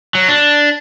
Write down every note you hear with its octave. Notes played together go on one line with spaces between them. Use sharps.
F#3
D4